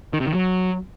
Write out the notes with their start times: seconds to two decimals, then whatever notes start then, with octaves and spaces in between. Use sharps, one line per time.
0.13 D#3
0.20 C3
0.27 D#3
0.34 F#3